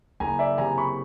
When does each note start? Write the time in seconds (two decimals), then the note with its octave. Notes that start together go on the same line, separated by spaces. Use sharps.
0.20 F#1 G#5 A#5
0.39 D5 E5
0.58 C3 G#5 A#5
0.78 B5 C#6